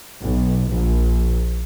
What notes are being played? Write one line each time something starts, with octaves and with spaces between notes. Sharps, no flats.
B1
A#1